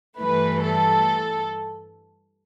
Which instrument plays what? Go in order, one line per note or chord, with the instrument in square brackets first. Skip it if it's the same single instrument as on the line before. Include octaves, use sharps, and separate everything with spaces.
[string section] G2 E3 A3 B4
A4